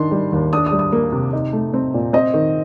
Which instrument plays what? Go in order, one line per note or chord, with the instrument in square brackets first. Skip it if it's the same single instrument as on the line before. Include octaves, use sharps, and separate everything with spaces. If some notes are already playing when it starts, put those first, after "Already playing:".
Already playing: [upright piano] D#3 D4 C6
G3
D#2
D4 D#6
D#6
G3
D#6
A#3
C3
D#4
A3
C4
A#2
C4 D#5
D#3